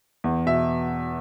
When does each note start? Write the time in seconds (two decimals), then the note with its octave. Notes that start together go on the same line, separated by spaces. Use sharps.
0.24 E2
0.46 B2 E5